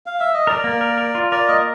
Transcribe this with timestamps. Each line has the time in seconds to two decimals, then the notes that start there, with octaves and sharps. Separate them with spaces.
0.06 F5
0.19 E5
0.34 D#5
0.47 A#4 D5
0.64 A#3
0.81 A#4
0.98 A#4
1.15 F4
1.31 A#4 D5
1.48 A#3 D#5